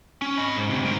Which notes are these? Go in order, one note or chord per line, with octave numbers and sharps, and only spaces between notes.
C#4
D#5 B5
G#2
D2 C3
G#2 A#4